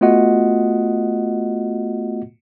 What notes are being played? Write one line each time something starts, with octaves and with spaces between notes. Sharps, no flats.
A3 B3 F4 F#4 D#5 F#5